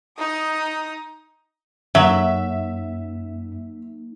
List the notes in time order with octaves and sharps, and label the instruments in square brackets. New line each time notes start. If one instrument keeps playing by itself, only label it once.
[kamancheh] D#4 D#6
[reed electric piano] F#2 [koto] F#3 [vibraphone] A#3 D#4 [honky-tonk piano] E5